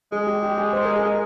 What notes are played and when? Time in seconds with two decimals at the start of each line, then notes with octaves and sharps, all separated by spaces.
0.12 G#3 G#4
0.27 G4
0.43 G4
0.58 G#4
0.73 C5
0.85 A#4
0.96 G#4
1.06 A#4